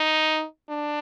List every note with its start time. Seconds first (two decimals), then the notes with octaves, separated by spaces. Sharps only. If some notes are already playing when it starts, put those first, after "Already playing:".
Already playing: D#4
0.69 D4